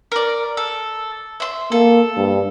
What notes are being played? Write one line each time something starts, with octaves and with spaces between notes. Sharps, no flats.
A#4 D5
A4
E5 C6
A#3 A4
G2